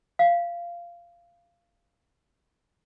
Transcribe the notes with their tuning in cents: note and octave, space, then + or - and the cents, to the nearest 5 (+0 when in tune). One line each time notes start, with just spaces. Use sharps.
F5 -15